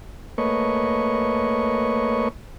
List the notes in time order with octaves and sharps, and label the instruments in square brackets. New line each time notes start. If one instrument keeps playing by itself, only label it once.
[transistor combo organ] A3 A#3 B4 C#5 D#5 C#6